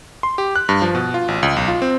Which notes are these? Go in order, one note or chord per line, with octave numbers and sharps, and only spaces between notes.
C6
G4
F#6
G2
F3
B2
F4
A1
C#2
B1
F4
C4